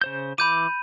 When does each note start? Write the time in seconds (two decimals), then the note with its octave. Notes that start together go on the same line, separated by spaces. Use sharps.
0.01 C#3 C5 G6
0.38 E3 B5 D6 G6 D#7